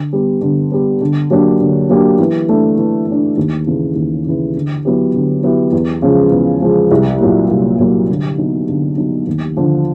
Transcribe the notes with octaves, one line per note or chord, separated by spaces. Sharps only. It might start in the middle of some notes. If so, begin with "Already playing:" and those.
Already playing: D3
G3 B3
D3
G3 B3
D3
F#3 A#3 D4 G4
D3
F#3 A#3 D4 G4
E3
A3 D4
E3
A3 D4
D#2
C#3 E3
D#2
C#3 E3
D3
F#3 B3 E4 G4
D3
F#3 B3 E4 G4
E2
C#3 F3 G#3
E2
C#3 F3 G#3
C2
A#2 F#3 A#3
C2
A#2 F#3 A#3
D3
F#3 B3 D#4
D3
F#3 B3 D#4
D#2
D3 F3